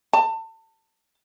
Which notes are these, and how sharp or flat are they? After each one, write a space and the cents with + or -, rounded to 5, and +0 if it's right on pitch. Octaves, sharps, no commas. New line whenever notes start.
A5 +30